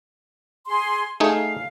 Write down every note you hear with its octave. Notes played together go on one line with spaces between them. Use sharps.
G#4 C6
A3 D#4 G#4 F5